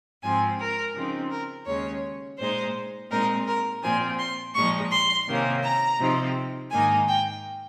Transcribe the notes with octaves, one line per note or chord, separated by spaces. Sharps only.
G#2 F3 C4 G#5
A#4
C#3 F3 C4 D#4
A#4
D#2 C#3 G#3 C#4 C#5
A#2 G#3 D#4 C5
A#2 G#3 C4 D#4 A#4
A#4
A#2 F3 C4 G#5
C6
A#2 F3 G#3 D#4 C#6
C6
C3 D#3 A#3 C#4
A#5
C3 F3 C4 D#4
G#2 D#3 A#3 D#4 G#5
G5